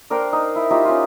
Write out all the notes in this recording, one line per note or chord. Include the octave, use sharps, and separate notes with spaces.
D4 A#4 C5 G5
D#4
E4
D#4 F4 G4 E5
C#4 F4